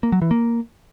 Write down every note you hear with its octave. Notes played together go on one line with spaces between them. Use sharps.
A#3
F#3
E3
A#3